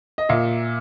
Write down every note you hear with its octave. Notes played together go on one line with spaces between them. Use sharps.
D#5
A#2 E5